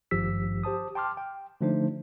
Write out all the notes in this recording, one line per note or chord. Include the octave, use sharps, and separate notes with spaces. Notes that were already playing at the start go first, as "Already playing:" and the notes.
G#1 G2 F3 G4 E6 B6
G4 C5 A5 D#6
G5 A5 C6 D6 F6
G5
D3 F3 A3 D4 D#4 C5